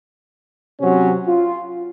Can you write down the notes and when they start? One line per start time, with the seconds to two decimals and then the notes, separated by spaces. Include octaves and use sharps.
0.80 C3 F#3 C4 C#4
1.27 F4